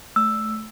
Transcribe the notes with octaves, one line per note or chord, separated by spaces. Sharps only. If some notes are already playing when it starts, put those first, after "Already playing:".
A3 E6